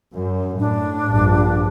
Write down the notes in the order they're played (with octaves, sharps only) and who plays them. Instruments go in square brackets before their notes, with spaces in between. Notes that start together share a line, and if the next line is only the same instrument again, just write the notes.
[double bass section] F#2
[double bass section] A2 [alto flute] D4
[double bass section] A#1 G2